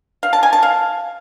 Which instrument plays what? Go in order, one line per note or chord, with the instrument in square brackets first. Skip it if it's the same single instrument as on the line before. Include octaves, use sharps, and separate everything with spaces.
[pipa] F5
A5
G#5
A5
F5